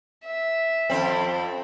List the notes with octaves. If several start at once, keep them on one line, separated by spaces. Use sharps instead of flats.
E5
F2 A2 C4